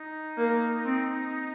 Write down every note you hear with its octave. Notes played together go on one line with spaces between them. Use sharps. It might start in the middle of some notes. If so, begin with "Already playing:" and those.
Already playing: D#4
A#3
C4